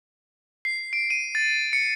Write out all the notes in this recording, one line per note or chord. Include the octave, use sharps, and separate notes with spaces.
C7
D7
D#7
A6
C#7